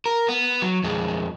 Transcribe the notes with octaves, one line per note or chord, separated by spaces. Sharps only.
A#4
B3
F#3
F2 G#3